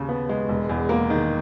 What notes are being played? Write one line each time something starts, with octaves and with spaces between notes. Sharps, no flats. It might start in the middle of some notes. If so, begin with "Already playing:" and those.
Already playing: D#2 C#3
B3
G#3
E1
E2
A#3
D#3